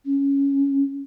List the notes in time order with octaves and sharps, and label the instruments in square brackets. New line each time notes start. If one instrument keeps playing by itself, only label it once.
[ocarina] C#4